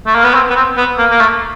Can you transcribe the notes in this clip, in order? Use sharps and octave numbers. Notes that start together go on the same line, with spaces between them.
A3
A#3
B3
C4
B3
C4
B3
A#3
A#3
A3